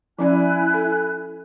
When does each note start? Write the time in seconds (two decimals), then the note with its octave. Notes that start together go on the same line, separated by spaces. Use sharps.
0.19 F3 C#4 E4 D5 G#5 F#6
0.74 A4